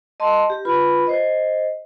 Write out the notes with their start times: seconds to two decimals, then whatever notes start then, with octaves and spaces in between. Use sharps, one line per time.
0.20 D#5 A5 C6
0.50 G4
0.65 F4 B4 B5
1.07 C5 D#5